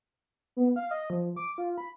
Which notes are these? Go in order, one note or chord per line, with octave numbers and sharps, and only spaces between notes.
B3
F5
D#5
F3
D6
F4
B5